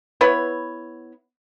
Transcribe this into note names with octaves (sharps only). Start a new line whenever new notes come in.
B3 E4 B4 C#5